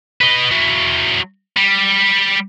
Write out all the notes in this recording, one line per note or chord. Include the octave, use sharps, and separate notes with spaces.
B4 D#5
F#3 E4
G3